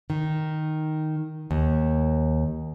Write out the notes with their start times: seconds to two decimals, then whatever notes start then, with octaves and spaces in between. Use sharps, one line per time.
0.10 D#3
1.51 D#2